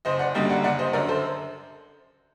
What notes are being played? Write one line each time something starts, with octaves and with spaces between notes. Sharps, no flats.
F#1 C5 D#5
D5 F#5
F#2 D3 G3 A#3 D#5 G5
D5 F#5
F#1 D5 F#5
C5 D#5
F#2 D3 A#4 D5
A4 C5